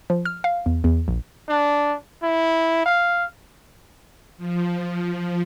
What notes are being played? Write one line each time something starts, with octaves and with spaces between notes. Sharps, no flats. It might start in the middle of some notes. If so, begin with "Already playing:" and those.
F3
F6
F5
E2
E2
A#1
D4
E4
F5
F3